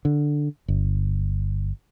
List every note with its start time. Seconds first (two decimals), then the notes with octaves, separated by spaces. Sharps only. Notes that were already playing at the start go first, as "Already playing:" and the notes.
0.05 D3
0.68 G1